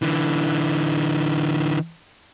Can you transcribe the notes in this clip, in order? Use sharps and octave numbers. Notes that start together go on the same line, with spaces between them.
D3 E3